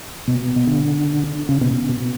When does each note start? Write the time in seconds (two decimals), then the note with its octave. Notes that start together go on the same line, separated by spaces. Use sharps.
0.28 B2
0.67 D3
1.49 C#3
1.61 B2
1.89 B2